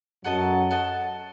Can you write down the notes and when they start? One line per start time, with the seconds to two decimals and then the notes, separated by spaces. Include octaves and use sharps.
0.24 F#2 F#3 F#4 A4 D#5 A5
0.71 F#4 A4 D#5 A5